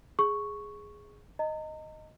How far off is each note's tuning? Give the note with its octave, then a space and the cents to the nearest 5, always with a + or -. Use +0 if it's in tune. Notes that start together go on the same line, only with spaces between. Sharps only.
G#4 +0 C#6 +0
D#5 +0 A#5 -35